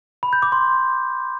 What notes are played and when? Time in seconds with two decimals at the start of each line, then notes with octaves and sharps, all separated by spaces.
0.23 B5
0.33 G6
0.42 D6
0.52 C6